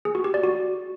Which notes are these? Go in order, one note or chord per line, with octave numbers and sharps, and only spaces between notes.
G#4
F#4
G4
D5
F#4